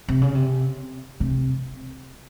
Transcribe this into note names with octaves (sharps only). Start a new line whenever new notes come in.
C3
C#3
C3
C3